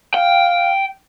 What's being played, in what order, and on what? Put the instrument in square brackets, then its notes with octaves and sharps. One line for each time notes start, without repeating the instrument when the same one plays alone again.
[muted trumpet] F5 [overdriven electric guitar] G5